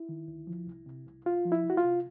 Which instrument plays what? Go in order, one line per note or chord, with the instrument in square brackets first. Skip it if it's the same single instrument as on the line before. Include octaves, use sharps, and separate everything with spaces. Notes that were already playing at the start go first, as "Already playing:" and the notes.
Already playing: [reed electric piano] E4
D#3
D2
F3
C2
C3
C2
C2 F4
F3
E4
C2
F#4
F4
C3